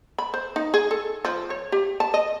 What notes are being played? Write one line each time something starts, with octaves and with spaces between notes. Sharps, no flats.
B5
C5
D#4
G#4
A4
F3
C#5
G4
A5
D#5